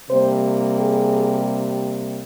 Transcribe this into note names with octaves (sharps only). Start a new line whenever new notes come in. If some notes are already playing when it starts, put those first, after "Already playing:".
C3 G3 A#3 C5
G#4